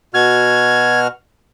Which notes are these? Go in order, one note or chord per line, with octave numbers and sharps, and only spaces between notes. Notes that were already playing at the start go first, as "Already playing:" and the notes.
B2 F#4 F6 G#6